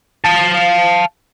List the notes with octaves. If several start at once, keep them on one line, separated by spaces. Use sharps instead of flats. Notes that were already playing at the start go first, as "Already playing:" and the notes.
F5 A5